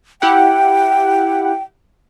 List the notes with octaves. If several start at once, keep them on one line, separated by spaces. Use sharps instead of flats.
E4 G4 F#5 G5